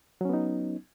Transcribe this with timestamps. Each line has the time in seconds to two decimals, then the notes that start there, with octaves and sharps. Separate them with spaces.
0.21 F#3
0.25 C#4
0.29 B3
0.34 D#4